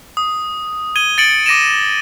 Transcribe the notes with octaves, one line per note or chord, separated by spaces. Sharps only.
D#6
G#6 D#7 G7
A6 C#7 D7 F#7
D6 A#6 D#7 E7